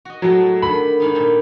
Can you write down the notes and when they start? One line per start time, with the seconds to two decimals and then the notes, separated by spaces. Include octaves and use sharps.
0.05 F#4 D#5
0.22 A2 F#3 G#3 A4
0.62 D3 D#3 B5
1.00 G#2 D#3 D#4
1.15 A#2 G3